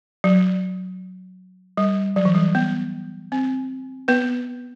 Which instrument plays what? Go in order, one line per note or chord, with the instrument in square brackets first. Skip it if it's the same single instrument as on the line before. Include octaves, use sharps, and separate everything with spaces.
[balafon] F#3
G3
F#3
E3
G3
B3
C4
B3 B4